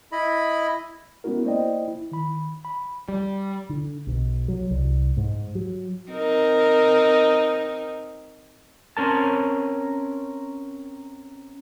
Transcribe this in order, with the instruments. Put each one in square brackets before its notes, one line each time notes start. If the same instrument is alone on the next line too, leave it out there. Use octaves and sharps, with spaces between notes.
[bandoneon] E4 D#5 B5
[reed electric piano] G#3 B3 C#4 E4 F#4 A#4
A#3 E4 C5 D5 D#5 G5
E4
D#3 B5
B5
[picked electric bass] G3
[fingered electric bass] D3
B1
F#3
C2
G#2
F#3
[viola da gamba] C4 D#4 A#4
[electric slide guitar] C4 C#4 A#4 A5